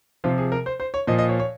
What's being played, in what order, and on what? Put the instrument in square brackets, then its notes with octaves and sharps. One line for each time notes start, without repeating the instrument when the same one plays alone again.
[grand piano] C3 F3 F4
G#4
A#4
C5
C5
C#5
A#2 F3 D#5
D#5
C#5
C#5